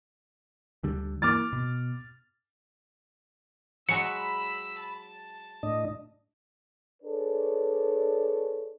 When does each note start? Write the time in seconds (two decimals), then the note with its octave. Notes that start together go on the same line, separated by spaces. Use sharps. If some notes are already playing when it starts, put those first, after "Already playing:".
0.83 D2 D3 G3
1.22 E3 A#3 D6 F6 A6
1.53 B2
3.89 F#3 G#3 F#4 B5 E6 C#7
4.80 A5
5.63 A2 D4 D#5
7.03 D4 G#4 A4 B4 C#5 D5